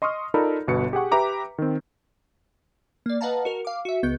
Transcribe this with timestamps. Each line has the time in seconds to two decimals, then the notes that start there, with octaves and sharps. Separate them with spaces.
0.02 D#5 C6 C#6 D#6 F6
0.34 D#4 F4 A4 A#4 D5 B5
0.68 G1 B2 B4 C#7
0.93 G4 G#4 F#5 C#6
1.12 G4 B4 E5 A#5 D6
1.58 D#3 C4
3.06 A#3 D5
3.21 B4 D#5 F5 F#5 A5 A#5
3.45 F#4 A#4
3.65 F5 D6
3.85 F#4 E5
4.03 C#2 B3 G6